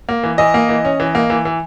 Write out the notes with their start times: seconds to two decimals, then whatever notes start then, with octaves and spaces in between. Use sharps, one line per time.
0.09 A#3
0.23 E3
0.38 E3 D#5
0.54 A#3
0.69 E3
0.85 C#4
1.00 E3
1.15 A#3
1.30 E3
1.45 E3